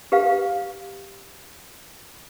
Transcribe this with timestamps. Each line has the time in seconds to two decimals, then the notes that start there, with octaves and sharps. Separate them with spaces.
0.12 G4 B4 F5